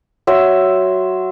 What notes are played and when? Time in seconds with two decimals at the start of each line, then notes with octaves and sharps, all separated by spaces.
0.27 F#3 E5 C6 E6